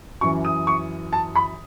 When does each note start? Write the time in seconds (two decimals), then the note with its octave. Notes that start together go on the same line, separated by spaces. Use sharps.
0.21 F#2 E3 C#6
0.45 D#6
0.67 C#6
1.13 A5
1.36 B5